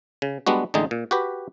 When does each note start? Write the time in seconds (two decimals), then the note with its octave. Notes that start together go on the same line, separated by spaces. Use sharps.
0.22 C#3
0.47 G3 G#3 B3 D4 F#4
0.74 A1 D3 G#3 D#4
0.91 A#2
1.11 F#4 G4 B4